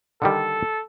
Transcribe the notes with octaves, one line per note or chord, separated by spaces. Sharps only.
D3 D#3 G3 A4